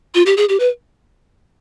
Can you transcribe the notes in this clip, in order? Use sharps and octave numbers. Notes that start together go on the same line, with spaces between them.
F4
G4
G#4
G4
B4